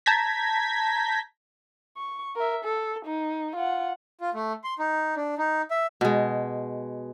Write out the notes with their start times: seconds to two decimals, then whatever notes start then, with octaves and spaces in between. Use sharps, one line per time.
0.06 A5 A#5 G6 G#6 A#6 B6
1.97 C#6
2.36 A#4 E5
2.64 A4
3.05 D#4
3.56 F4 F#5
4.21 F4
4.34 A3
4.64 C6
4.79 D#4
5.16 D4
5.38 D#4
5.71 E5
6.01 B2 G#3